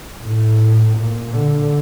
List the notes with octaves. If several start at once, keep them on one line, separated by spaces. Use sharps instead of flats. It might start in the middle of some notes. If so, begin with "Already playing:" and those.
A2
A#2
D3